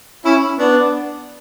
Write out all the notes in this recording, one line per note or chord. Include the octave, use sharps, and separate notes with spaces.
C#4 E4
B3 D4